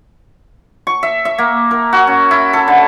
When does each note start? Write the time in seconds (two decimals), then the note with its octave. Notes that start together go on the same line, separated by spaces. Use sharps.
0.87 C#6
1.03 E5
1.25 E5
1.38 A#3
1.71 A#4
1.93 F#4
2.07 C#4
2.31 E4
2.53 A4
2.68 D3